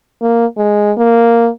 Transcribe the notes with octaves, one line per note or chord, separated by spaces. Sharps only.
A#3
G#3
A#3